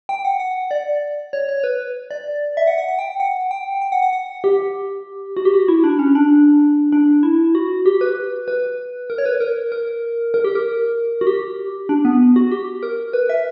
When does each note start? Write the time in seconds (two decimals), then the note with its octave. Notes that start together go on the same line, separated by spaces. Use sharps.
0.09 G5
0.25 F#5
0.40 F#5
0.71 D5
1.33 C#5
1.49 C#5
1.64 B4
2.11 D5
2.57 E5
2.67 F#5
2.78 F#5
2.88 F#5
2.99 G5
3.20 F#5
3.51 G5
3.82 G5
3.92 F#5
4.02 F#5
4.13 F#5
4.44 G4
5.37 F#4
5.45 G4
5.54 F#4
5.68 E4
5.84 D4
5.99 C#4
6.15 D4
6.92 D4
7.23 E4
7.55 F#4
7.86 G4
8.01 B4
8.48 B4
9.10 A#4
9.18 C#5
9.26 B4
9.40 A#4
9.72 A#4
10.34 A#4
10.44 G4
10.55 A#4
11.21 F#4
11.27 G4
11.89 D4
12.05 B3
12.36 F#4
12.51 G4
12.83 A#4
13.13 B4
13.29 E5